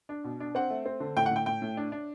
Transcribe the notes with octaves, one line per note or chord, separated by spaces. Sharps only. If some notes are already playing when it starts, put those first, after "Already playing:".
D4
B2
D4
C4 F#5
A3
C4
D3
A2 G5
F#5
A2 G5
A2 G5
A2
D4
D4